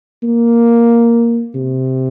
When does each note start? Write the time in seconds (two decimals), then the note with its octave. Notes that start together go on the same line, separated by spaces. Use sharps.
0.23 A#3
1.55 C3